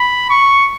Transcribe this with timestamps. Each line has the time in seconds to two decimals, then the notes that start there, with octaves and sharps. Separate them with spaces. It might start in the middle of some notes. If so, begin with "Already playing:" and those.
Already playing: B5
0.30 C#6